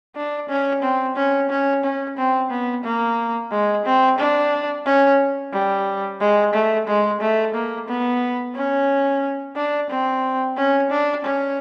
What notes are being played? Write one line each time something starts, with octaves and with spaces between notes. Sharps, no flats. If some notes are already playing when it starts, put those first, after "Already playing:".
D4
C#4
C4
C#4
C#4
C#4
C4
B3
A#3
G#3
C4
D4
C#4
G3
G#3
A3
G#3
A3
A#3
B3
C#4
D4
C4
C#4
D4
C#4